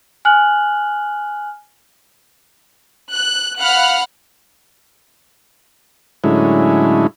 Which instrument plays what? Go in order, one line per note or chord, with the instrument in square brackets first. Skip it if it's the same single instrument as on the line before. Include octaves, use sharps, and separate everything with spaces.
[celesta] G#5 F6 F#6 F#7
[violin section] F#6
F5 F#5 B5 F6 F#6
[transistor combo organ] A2 D3 F#3 G#3 C#4 E4